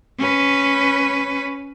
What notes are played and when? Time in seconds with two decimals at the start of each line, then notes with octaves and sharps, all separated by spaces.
0.18 C#4 B4